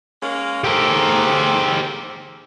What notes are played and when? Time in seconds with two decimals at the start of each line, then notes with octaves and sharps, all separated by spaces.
0.23 G#3 A#3 C#4
0.64 G#2 C4 G4 A4 A#4